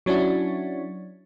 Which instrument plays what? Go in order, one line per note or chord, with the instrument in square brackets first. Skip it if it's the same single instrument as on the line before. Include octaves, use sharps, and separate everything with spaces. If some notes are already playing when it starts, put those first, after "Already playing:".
[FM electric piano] F#3 C#4 D4 E4 F#4